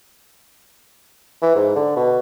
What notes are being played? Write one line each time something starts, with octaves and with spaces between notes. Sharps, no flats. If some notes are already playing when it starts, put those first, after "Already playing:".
E3
G#2
D3
B2